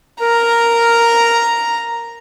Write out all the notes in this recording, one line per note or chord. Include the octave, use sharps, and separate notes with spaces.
A#4 A#5